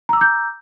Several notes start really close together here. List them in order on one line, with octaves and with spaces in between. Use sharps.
A#5 E6 D6 G6